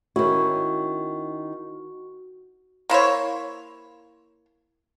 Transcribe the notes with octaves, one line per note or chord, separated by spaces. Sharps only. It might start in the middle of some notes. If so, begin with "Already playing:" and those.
D#3 C#4 E4 F#4
A#3 E4 C5 C#5